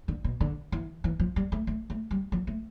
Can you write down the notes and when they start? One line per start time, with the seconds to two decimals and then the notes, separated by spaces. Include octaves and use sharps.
0.08 D3
0.24 B2
0.41 D3
0.72 E3
1.04 E3
1.20 F3
1.36 G3
1.52 A3
1.67 A3
1.90 A3
2.11 G3
2.32 F3
2.47 A3